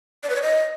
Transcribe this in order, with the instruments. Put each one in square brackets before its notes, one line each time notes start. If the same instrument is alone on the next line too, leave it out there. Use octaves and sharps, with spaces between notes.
[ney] D5
B4
C#5
D#5